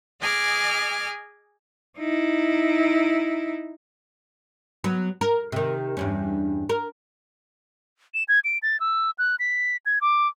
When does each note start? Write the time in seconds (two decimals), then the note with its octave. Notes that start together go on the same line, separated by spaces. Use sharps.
0.19 G#4 D#5 G#5 D6 F6
1.99 D#4 E4
4.84 F#3 B3
5.21 A#4
5.52 C3 D#3
5.97 E2 G2 C#4
6.69 A#4
8.14 E7
8.28 G#6
8.44 D7
8.63 A6
8.80 E6
9.18 F#6
9.39 B6
9.86 G#6
10.01 D6